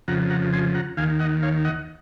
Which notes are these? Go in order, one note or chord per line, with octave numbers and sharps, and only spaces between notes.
F2 C#3 F3 F#5 A#5
F#5 A#5
G#5 C6
F#5 A#5
D#2 D#3 F5 G#5
D#5 F#5
C#5 F5
D#5 F#5